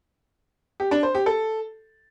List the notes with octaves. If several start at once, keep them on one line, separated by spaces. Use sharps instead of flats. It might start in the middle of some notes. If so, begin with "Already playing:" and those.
G4
D4
C5
G4
A4